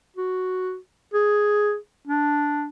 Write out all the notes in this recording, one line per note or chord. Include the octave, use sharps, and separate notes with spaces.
F#4
G#4
D4